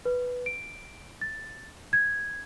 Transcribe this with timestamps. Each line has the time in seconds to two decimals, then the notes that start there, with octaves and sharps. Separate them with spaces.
0.05 B4
0.46 D7
1.21 A6
1.93 G#6